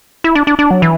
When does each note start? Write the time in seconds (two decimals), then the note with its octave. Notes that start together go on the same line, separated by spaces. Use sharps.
0.24 E4
0.35 D4
0.47 D4
0.59 D4
0.71 F#3
0.82 E3